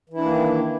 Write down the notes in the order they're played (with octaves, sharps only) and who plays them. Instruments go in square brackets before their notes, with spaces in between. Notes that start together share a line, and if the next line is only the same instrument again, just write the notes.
[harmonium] E3
E4
D4
A#3
D#3